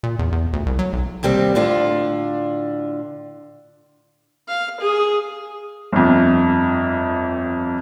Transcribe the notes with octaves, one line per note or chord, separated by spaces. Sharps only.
A#2
E2
E2
D2
C2
F#3
B1
D#2 C3 G3 C4
A2 D3 D4 F4
F5
G#4
G1 F2